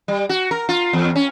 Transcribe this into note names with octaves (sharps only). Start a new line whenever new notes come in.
G3
F#4
A#4
F4
E2
C#4